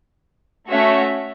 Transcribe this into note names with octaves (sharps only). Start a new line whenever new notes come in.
A3 C#4 F#4 C#5 E5